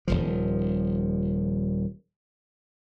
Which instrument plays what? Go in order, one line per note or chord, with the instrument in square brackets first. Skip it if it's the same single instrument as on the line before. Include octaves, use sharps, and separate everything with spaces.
[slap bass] D#1 A#1 F3